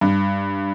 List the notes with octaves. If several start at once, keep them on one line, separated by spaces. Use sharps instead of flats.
G2